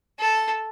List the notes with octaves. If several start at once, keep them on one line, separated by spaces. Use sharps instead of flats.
A4